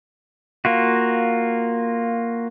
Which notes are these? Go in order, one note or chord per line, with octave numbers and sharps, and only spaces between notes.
A#3 F4 F#4